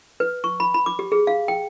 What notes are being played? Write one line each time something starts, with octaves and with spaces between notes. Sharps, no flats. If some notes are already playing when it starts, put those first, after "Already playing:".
B4
C#6
B5
B5
D6
G4
G#4
F5
G5